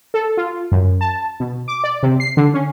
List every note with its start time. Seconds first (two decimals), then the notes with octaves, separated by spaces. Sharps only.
0.14 A4
0.37 F4
0.72 F#2
1.01 A5
1.40 B2
1.68 D6
1.84 D5
2.03 C3
2.20 C7
2.37 D3
2.54 C#4